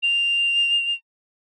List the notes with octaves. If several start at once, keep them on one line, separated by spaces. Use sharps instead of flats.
F7